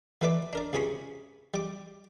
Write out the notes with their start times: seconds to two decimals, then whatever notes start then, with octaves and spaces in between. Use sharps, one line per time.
0.21 E3 A3 E4 B4 D5 D6
0.53 D4 A#4 D5
0.73 C#2 C3 G#4 G#5 B5 C#6
1.54 G3 D6